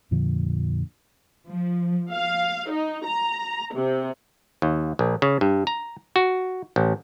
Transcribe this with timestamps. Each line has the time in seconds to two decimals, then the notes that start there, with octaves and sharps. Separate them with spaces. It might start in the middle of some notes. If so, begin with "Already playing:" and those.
0.11 F2 A#2 D3 F3
1.48 F3
2.11 F5
2.69 D#4
3.05 A#5
3.73 C3
4.62 D#2
4.99 A#1
5.22 C#3
5.41 G2
5.67 A#5
6.16 F#4
6.76 A1